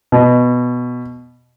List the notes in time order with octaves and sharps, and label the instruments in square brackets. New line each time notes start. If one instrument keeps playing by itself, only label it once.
[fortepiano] B2